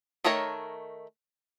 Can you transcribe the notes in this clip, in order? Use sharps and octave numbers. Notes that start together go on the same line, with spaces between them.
D#3 A3 A#4 C#5 A#5